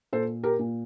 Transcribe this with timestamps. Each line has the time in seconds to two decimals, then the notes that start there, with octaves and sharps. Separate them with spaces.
0.13 A#2 A4 C5
0.43 G4 A#4
0.59 A#2